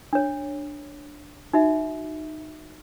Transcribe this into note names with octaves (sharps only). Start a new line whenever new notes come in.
D4 C#5
D#4 F#4 E5